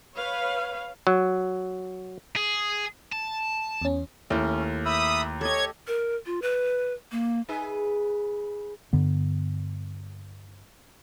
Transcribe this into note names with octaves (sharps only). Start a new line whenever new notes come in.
B4 C#5 F5
F#3
G#4
A5
E2 C#4
D#2 A3 C#4 E4
E5 B5 D#6 E6
G4 A4 C#5 D#5 G#6
A#4
F4
B4
A#3
D#4 G#4 B4
G2 D3 B3